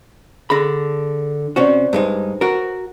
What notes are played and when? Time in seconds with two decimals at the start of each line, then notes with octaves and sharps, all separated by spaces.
0.50 D3 G#4 B5 A#6
1.56 C3 C#4 F#4 C5 D5
1.93 G2 G#3 D#4 B4 C5
2.41 F#4 A#4